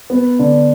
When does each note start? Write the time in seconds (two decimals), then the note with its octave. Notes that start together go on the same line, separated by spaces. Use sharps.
0.10 B3
0.39 D3